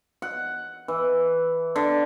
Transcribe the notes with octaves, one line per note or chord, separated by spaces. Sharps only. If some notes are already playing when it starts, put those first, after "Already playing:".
F#5
E3
D3